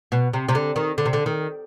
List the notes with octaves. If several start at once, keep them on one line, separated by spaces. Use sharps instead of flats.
B2
C3
C3
D3
D#3
D3
C3
D3
D#3